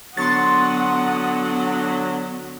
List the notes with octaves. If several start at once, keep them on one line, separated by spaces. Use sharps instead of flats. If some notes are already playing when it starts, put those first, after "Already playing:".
D3 F#3 B3 F#5 C6 C#6 D#6 A6